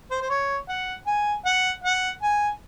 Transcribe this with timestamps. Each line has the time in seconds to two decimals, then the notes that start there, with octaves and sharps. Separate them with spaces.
0.11 C5
0.21 C5
0.30 C#5
0.69 F#5
1.07 G#5
1.45 F#5
1.84 F#5
2.22 G#5